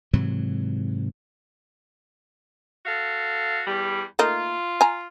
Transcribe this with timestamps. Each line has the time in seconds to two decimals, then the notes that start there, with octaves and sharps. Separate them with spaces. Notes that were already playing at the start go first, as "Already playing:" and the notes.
0.13 G#2 C3 E3 F#3
2.86 F#4 A4 F5
3.66 E2 G3
4.19 A3 A#3 D#4 F4
4.81 G#5 A#5